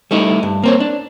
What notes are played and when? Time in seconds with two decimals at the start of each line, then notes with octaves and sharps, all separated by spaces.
0.11 G3 A3 D#4 E4
0.43 G2
0.63 A#3 C4 C#5
0.80 D4